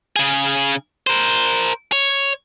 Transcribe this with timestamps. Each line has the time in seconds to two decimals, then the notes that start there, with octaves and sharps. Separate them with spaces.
0.16 C#3 G#4
1.07 A#4 C5
1.92 C#5